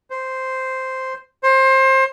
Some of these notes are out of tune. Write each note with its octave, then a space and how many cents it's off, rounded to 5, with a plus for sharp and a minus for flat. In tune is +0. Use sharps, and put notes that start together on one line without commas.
C5 -5
C5 +25